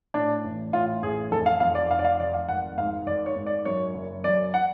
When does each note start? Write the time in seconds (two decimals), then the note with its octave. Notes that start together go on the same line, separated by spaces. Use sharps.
0.14 A2 D4
0.45 A1
0.73 A2 F4
1.02 A1 G#4
1.31 F1 A4
1.46 F5
1.60 F2 F5
1.75 D5
1.90 F1 F5
1.99 D5
2.05 F5
2.20 F1 D5
2.34 F5
2.48 G#1 F#5
2.78 G#2 F5
3.07 G#1 D5
3.26 C#5
3.36 G#2
3.46 D5
3.65 F#2 C#5
3.94 F#1
4.24 F#2 D5
4.54 F#5